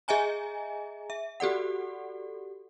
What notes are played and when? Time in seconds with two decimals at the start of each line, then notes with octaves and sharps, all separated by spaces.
0.08 G#4 D#5 E5 G#5 A#5
1.10 E5
1.40 F#4 G4 A4 D5 F#5